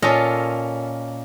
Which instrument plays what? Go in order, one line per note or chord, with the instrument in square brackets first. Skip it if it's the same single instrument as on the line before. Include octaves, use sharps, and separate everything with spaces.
[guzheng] A#2 C#4 F4 A4 D#5